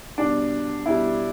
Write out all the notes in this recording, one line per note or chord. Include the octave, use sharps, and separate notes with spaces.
B2 G3 D4
B2 G3 E4